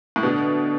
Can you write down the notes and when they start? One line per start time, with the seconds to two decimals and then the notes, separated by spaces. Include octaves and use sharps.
0.16 A2
0.23 B2 D3